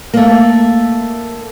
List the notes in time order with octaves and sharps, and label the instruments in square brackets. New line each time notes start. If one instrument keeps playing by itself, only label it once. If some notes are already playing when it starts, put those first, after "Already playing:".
[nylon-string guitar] A3 A#3